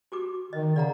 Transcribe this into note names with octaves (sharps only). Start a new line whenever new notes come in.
F#4 G4 D6
D#3 D#5
C#3 D5 F#5 A#5